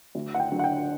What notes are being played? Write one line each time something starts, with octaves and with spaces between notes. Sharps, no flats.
D2
F#5
G5
D3 F#3
F#5
G5